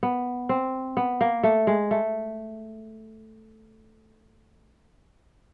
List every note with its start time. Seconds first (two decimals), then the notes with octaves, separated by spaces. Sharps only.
0.03 B3
0.49 C4
0.97 B3
1.21 A#3
1.43 A3
1.67 G#3
1.91 A3